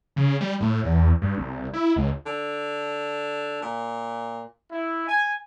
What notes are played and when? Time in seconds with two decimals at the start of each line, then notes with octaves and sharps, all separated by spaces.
0.16 C#3
0.41 G3
0.60 A2
0.84 E2
1.22 G2
1.38 C2
1.73 E4
1.96 C#2
2.26 D3
3.62 A#2
4.71 E4
5.07 G#5